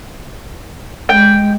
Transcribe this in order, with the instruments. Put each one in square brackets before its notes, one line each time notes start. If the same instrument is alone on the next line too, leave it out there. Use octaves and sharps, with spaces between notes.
[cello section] G#3 [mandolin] G5